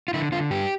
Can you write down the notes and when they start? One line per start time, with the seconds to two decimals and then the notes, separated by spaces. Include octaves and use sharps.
0.08 F4
0.14 D3 E4
0.32 D3 F4
0.51 G2 G4